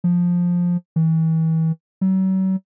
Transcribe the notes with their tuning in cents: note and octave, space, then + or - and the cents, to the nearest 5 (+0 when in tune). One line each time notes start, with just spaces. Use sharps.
F3 +10
E3 -35
F#3 +40